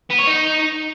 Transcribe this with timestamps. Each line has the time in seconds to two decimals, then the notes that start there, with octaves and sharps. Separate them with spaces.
0.11 B3
0.19 C#5
0.28 D#4